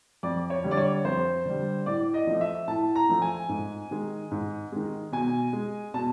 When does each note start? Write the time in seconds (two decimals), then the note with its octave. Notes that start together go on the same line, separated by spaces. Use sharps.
0.23 F2 D5
0.50 C#5
0.64 D3 G3
0.71 D5
0.77 C#5
1.05 F2 C5
1.45 D3 G3
1.86 A2 D5
2.14 D#5
2.27 F3 A3
2.41 E5
2.67 A2 A5
2.95 A#5
3.09 F3 A3
3.22 G#5
3.49 G#2
3.91 D#3 G#3
4.31 G#2
4.72 D#3 G#3
5.12 B2 G#5
5.53 G#3
5.94 B2 A5